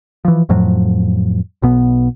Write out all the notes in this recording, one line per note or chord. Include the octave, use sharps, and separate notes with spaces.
E3 F3
F2 A2 F3 F#3
B1 B2 B3